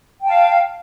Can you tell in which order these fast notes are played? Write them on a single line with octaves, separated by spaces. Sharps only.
G5 A5 F5